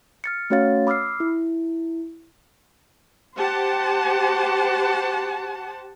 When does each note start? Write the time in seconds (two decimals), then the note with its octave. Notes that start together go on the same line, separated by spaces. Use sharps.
0.24 F6 A6 C#7
0.50 A3 C#4 F#4 C#5 F5 A6
0.87 B5 D6 E6 F6 C7
1.20 E4
3.37 G4 C5 F#5 A5